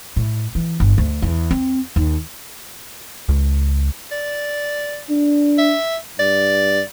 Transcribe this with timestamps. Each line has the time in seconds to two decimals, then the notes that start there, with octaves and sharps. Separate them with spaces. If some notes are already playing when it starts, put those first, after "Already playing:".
0.16 A2
0.55 E3
0.80 G1
0.98 D2
1.22 E2
1.51 C4
1.96 D#2
3.29 C#2
4.11 D5
5.10 D4
5.58 E5
6.19 G2 D5